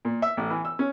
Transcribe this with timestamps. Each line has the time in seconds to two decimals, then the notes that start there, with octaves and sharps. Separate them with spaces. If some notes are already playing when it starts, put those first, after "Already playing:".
0.05 A#2
0.22 E5
0.37 A1
0.50 E3
0.65 E6
0.79 C#4